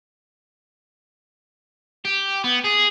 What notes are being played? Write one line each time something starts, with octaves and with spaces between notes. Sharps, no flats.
G4
B3
G#4